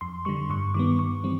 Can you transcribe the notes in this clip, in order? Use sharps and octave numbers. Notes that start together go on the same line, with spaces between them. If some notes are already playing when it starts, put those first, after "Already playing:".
F2 C6
D3 G3 C#6
G2 C#6
D#3 G3 B3 D6
G2 C#6
E3 G3 C4